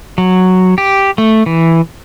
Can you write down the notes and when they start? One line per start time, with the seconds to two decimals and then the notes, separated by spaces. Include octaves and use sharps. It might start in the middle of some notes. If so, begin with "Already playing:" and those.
0.18 F#3
0.78 G4
1.18 A3
1.46 E3